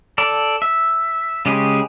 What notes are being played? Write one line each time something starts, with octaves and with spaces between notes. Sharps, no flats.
A4 D5
E5
C#3 G#3 G4 G#4